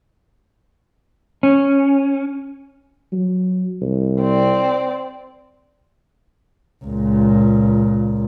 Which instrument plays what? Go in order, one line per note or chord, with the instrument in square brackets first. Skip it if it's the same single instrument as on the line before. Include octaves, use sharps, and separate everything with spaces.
[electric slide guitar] C#4
[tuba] F#3
C2
[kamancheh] C4 D5
[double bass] C#2 A#2